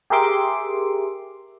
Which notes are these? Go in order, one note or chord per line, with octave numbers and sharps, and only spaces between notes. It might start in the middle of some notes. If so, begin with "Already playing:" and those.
G4 G#4 A#4 E5 C6 D6